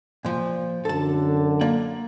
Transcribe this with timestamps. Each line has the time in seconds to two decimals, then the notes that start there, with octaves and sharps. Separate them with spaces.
0.25 A#2 F3
0.85 F#2 D3 A4 A5
1.61 A#3 D5